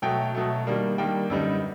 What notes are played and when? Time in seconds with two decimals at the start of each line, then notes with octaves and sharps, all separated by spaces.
0.02 B2 F#3 A3 G5
0.35 B2 F#3 A3
0.67 D#3 G3 A#3 D4
0.98 D#3 G3 A#3 D4 G5
1.30 F#2 D3 G3 B3 D#4